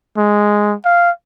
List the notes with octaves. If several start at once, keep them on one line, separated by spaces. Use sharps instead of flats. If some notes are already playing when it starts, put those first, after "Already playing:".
G#3
F5